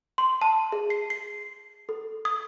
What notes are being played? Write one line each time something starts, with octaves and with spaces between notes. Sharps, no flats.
C6
A5
G#4
C7
C7
A4
D#6